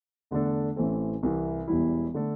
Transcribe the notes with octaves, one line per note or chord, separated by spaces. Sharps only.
E2 D3 A3 D4 A4
A1 A2 E3 C4 A4
C2 C3 E3
E1 E2 E3 G3 E4
D3 A3 D4 A4